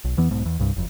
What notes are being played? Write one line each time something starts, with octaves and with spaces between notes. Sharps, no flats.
B1
E2 E3 B3
B1 G#2 B2
E2
C2 G2
F#1 F2